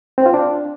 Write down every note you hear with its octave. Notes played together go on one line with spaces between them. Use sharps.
C4
F4
D4